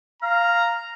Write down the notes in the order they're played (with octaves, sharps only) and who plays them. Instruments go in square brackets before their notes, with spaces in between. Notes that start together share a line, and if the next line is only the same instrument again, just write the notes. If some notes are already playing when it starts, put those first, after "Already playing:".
[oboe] F5 [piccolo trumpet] A#5